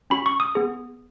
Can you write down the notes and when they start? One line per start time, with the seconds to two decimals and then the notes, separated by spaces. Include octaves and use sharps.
0.10 C#4 F#4 B5
0.26 C#6
0.40 D#6
0.55 B3 G#4